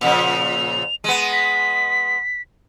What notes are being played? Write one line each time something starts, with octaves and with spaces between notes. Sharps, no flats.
A#2 C#3 F3 F7
G#3 B3 D#7
B6